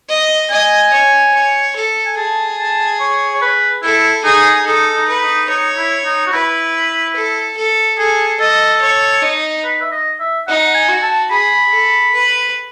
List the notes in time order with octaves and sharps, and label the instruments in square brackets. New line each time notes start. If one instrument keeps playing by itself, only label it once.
[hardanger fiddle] D#5
[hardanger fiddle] D#5 [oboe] G#5
[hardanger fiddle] C#5
C#5
A4
[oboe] G#5
[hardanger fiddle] G#4 [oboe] A5
[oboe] A5
C#5
C#5
B4
[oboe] E4 [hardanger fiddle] A4
[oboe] D#4 [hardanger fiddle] G#4
[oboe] D#4 [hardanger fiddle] A4
[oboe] D#4
[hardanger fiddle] B4
[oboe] D#4
[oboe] D#4 [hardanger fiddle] C#5
[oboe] E4
D#4
F#4
[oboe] E4 [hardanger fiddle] B4
[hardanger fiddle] A4
A4
[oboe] G#4 [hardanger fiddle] A4
[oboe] A4 [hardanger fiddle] D#5
[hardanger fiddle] C#5
D#4
[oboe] B4
E5
D#5
E5
[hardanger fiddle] D#4 [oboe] F#5
[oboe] G#5
[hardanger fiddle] F#4
[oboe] A5
[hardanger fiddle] G#4 [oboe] B5
[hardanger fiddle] A4
B4